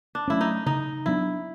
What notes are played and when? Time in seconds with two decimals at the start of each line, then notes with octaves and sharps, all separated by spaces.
0.15 D4
0.28 F#3 A3 C#4 E4
0.41 D#4
0.66 C#3 D#4
1.06 F#3 B3 D4 E4